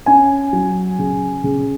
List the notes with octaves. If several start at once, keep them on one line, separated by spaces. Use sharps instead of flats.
C#4 G#5
F#3
C#3
C#3